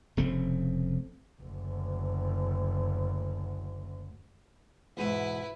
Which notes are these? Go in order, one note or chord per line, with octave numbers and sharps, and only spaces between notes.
F1 C#3 A3 C4
F#1 D2
E2 G#2 B2 E4 B4